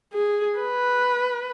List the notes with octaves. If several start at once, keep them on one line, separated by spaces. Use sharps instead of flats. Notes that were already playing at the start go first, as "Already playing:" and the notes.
G#4
B4